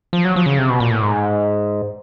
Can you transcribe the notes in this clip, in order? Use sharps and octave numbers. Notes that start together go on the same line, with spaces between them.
F3
F#3
F3
C#3
C3
B2
A#2
A2
G#2